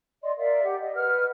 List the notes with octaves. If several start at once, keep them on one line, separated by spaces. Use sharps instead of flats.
D5 D#5 C6
A#4 D5 E5 F5
G4 F#5
D#5
B4 F#5 F6